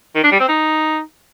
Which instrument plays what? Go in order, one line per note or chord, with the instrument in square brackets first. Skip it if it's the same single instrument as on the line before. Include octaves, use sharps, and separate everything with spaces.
[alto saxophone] D#3
D4
G3
C4
D#4